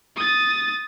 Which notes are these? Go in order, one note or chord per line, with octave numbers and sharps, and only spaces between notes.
D#6 A6